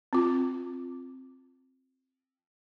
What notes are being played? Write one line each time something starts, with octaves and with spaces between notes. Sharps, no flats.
C4 F4